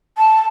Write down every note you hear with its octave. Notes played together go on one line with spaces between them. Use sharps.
A5